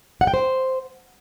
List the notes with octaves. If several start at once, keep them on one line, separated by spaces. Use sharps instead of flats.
F#5
G5
C5